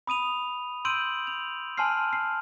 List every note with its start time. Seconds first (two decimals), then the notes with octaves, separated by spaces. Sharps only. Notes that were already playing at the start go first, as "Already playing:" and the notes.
0.07 B5 D#6 D#7 F7
0.85 C6 E6 G6 D7 D#7 F#7
1.27 F7
1.77 G#5 A5 C6 F6 C7
2.13 C7